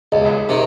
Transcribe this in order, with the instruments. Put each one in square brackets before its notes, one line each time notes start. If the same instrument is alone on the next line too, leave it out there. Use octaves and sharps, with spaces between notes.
[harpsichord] C#2 [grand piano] D#5
[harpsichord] C3 D#3